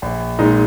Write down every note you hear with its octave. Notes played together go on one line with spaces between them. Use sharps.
A#1
A#2 G#3 D#4